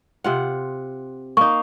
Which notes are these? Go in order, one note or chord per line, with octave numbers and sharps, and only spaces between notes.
C3 F4 F#5
A#3 D#4 C#6